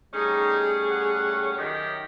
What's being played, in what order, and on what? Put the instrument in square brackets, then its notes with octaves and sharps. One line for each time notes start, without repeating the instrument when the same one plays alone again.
[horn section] G3 A3 C#4 [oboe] D#4 [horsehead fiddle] G#4
[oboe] F#5
[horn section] F#2 D#3 [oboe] G4